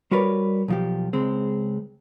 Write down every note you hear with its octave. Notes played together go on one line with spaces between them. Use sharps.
G3 F#4 A#4 B4 C#5 D5
B1 F3 G4
C#2 G#3 C4